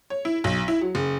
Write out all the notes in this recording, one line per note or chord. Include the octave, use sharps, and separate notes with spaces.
C#5
E4
B1
E4
F#3
F#1